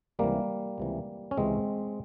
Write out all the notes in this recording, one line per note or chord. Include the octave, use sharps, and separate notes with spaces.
C#2 C3 E3 G3 A#3
C#2 C3 E3
C#4
C#2 C3 E3 G#3 C4